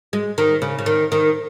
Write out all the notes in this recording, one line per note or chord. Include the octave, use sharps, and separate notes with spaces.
G#3
D#3
C#3
C#3
D#3
D#3